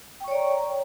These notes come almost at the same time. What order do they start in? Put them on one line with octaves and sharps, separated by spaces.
G5 C#6 C#5 D5 A#5